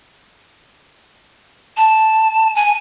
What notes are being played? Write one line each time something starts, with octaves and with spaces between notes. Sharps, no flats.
A5
G#5